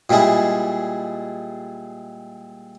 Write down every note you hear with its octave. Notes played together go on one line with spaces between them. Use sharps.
A#2 G3 G#3 E4 G#4